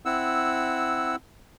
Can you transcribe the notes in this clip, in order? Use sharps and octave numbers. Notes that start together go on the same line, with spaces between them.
C4 E4 F#5 E6